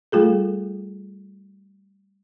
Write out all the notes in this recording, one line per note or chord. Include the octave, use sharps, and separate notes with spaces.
G3 A3 F4 G#4 A4